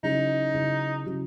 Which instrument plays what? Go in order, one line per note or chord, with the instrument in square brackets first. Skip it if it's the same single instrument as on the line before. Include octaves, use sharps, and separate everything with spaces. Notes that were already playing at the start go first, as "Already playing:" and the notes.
[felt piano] C#3 F#3 C#4 E4 [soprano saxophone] D#4
[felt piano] C#3 F#3 C#4 E4
C#3 F#3 C#4 E4